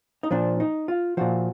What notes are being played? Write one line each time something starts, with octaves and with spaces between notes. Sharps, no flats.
D#4
A#2 F3 D4
D#4
F4
A#2 F3 F#4